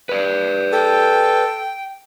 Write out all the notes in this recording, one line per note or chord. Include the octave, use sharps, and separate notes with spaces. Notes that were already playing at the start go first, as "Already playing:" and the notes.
B4 D5
A4 G5